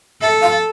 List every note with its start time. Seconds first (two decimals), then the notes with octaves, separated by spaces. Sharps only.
0.22 A4 E5
0.42 F5